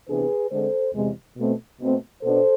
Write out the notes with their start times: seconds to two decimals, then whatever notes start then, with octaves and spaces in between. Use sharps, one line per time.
0.09 C3 E3 B3 D4 G#4 B4
0.51 D3 G#3 C4 A4 C5
0.94 E2 C3 G#3
1.37 B2 A3 C4
1.80 B2 A3 C4
2.23 B2 B3 D4 A4 C5